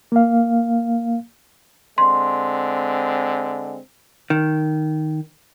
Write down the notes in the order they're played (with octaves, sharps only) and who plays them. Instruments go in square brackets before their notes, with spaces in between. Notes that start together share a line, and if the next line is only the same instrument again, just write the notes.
[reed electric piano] A#3 F5
[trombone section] D3 G#3 C4 [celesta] C6
[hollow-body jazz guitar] D#3